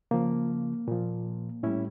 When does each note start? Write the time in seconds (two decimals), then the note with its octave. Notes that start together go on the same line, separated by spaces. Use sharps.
0.11 C#3 F3 A#3
0.88 A#2 F3
1.63 A2 G3 C#4 E4